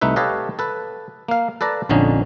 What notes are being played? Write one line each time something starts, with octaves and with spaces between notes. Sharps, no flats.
C2 A3 D#4 B4 E5
G4 A4 B4 C#5 D#5 F5
A4 B4
A#3 F5
A4 B4 D5 A5 A#5
A#1 F2 D3 C#4 D#4